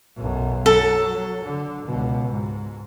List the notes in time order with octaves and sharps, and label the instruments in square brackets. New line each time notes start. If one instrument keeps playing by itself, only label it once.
[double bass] B1 F#2
[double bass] F#3 [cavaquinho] A4
[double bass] D3
C#2 B2
G#2